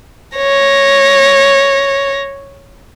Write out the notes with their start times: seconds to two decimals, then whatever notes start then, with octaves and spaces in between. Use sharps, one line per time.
0.36 C#5 A#6